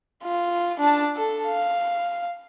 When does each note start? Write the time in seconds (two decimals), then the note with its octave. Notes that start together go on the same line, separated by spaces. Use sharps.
0.23 F4
0.80 D4 A5
1.16 A4
1.47 F5